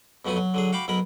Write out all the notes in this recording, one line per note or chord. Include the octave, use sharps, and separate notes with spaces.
F2 B2 F#3 A3 B3 G#5
F#3
D3 F#3 G#4
F#4 F5 G5 B5 D6
B1 B2 F#3 A#4 B5